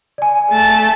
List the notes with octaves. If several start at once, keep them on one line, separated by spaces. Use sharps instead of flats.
D5 G#5
A3 A5